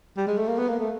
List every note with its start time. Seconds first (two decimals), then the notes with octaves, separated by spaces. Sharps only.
0.17 G3
0.27 G#3
0.38 A3
0.48 A#3
0.58 B3
0.68 A#3
0.79 A3